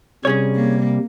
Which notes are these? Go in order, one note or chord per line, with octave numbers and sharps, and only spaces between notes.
C3 G3 C#4 G#4 C#5
A#3